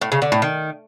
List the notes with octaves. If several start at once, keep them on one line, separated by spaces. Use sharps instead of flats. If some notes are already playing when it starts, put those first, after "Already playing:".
A2
C#3
D3
A2
D#3